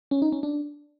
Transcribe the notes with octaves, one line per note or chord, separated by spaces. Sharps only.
C#4
D#4
C#4
D4